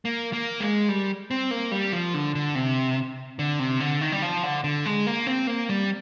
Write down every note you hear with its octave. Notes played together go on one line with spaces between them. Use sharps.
A#3
A#3
G#3
G3
C4
A#3
G3
F3
D3
D3
C3
D3
C3
D3
D#3
G3
F3
D3
D3
G#3
A#3
C4
A#3
G3